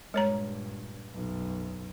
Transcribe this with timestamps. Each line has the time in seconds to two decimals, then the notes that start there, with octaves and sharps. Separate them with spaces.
0.14 G2 A#2 G#3 C#5 A#5
1.11 B1 F#2